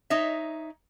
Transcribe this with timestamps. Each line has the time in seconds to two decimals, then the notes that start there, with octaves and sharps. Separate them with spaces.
0.10 D#4 C#5 E5